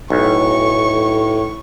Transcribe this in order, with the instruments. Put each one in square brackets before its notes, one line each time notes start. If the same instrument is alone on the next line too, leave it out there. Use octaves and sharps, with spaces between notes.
[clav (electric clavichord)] B1 [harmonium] A2 [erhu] C#6